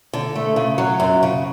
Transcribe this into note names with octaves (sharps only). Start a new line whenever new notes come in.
D3
A3
C#3
F#3
F#2
C#3